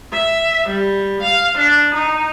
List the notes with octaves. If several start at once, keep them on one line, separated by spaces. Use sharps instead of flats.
E5
G3
F5
D4
D#4